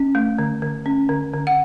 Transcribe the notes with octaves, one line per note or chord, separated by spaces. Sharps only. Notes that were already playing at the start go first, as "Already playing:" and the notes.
Already playing: C#4
A3
D3
D3
C#4
D3
D3
F#5